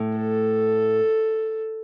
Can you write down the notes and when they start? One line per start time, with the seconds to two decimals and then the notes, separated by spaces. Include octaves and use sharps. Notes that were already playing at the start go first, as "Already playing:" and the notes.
Already playing: A2
0.17 A4